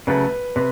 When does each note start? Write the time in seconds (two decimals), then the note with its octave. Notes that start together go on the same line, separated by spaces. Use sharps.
0.07 C#3 F#3 A3 B4
0.56 C3 B4